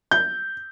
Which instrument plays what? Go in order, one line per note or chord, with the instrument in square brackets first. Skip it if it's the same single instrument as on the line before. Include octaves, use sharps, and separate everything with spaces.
[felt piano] G6